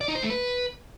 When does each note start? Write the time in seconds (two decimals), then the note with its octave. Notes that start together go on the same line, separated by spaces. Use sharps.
0.01 D5
0.08 D#4
0.15 C5
0.23 A3
0.30 B4